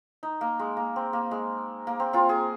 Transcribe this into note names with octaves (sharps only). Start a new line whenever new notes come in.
D#4
A#3
G#3
A#3
C4
A#3
G#3
A#3
C4
C4 F4
G#4